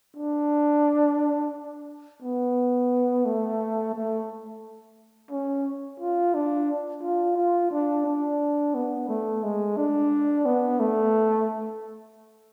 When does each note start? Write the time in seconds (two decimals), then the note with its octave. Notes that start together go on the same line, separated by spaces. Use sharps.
0.16 D4
2.23 B3
3.25 A3
3.94 A3
5.31 C#4
6.00 F4
6.34 D4
7.02 F4
7.36 F4
7.71 D4
8.06 D4
8.75 B3
9.09 A3
9.43 G#3
9.77 D4
10.46 B3
10.80 A3